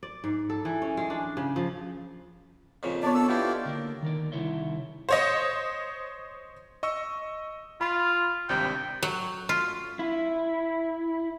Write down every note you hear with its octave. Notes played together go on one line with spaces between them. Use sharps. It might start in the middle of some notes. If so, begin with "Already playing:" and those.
D5
G#2
A4
E3
C#4
G#3
D4
C#3
F3
F2 A#2 C#3
B3 D4 C#5 D5
A4 E6
B2 E4 F4 G4 D5
D3 A#3 D4
D#3 A#4 D5
C2 D#3 E4 C#5 E5 C6
C5 C#5 D#5
D#5 C#6 E6
F4 B5 C6
G#1 G2 C3 G5
F#3
F4
E4